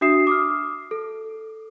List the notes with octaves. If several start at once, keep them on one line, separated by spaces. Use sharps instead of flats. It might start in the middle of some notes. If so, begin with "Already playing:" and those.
D4 F#4 E5 D#6 C7 E7
D6 D#6 F6
A4